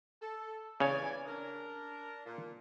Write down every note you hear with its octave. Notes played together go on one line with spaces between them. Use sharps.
A4
C#3 E3 C#5 D5 G#5
D4 A#4
A#2